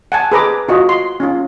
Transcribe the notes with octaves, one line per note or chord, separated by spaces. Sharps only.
F#5 G#5 A5
G#4 B4 A#5 D6
F4 F#4 D#5
C6
C#4 F4